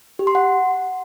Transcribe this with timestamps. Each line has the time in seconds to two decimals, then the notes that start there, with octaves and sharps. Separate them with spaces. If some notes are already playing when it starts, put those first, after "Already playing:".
0.19 G4
0.27 C6
0.35 F#5